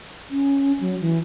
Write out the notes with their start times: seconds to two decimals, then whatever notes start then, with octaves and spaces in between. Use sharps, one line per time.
0.30 C#4
0.81 F#3
1.01 E3